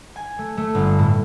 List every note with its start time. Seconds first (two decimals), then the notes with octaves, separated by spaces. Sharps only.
0.16 G#5
0.39 A3
0.57 A3
0.75 G1
0.99 A2